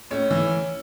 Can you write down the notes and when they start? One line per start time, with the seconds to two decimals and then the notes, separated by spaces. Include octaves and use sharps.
0.11 A2 C#4
0.31 E3